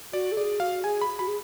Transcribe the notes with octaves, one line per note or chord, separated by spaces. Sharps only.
F#4 D5
A4
G#4 D5
F#4 F5
G#4 G#5
B5
F#4 B5
G#4